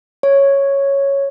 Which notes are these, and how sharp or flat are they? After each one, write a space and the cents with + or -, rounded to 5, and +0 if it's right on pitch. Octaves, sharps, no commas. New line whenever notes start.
C#5 +0